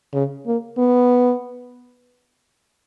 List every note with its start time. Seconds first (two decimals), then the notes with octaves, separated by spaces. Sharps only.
0.14 C#3
0.47 A#3
0.78 B3